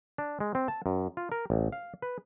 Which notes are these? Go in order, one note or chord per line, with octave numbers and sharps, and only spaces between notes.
D4
G#3
C4
A5
F#2
F4
A#4
A1
F5
B4